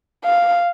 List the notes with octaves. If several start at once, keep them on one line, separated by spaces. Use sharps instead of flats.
F5